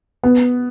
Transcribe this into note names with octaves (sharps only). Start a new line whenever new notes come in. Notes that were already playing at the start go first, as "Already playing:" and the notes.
B3